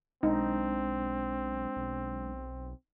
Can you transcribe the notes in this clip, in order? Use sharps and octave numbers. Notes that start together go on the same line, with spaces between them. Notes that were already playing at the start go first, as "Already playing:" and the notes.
B1 G#3 C4 D4 D#4
B1